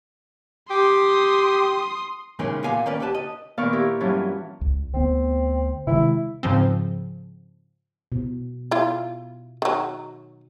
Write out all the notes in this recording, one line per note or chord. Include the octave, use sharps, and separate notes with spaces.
G4 C6 D#6
C#2 A#2 D#3 E3 G#3 C#4
A#2 A#3 B3 F5 G#5
D#3 A#3 C#4 B4 D5
D2 G4 B4 A5
D#5
A#2 D#3 B3 D5 F5 C#6
E4 G4 A#4
G2 E3 F#3 C#4 F4
C#2
D2 B3 C4
C3 D#3 G#3 E4
G#2 C#3 F3 C4
B2
E4 F4
D#3 F#3